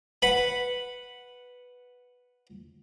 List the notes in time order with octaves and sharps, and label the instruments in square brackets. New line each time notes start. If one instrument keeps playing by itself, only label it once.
[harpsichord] B4 F#5 B5